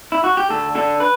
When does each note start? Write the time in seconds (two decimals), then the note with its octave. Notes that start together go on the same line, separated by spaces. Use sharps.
0.12 E4
0.24 F#4
0.37 G4
0.50 D2 A4
0.75 D3 A4
1.00 B4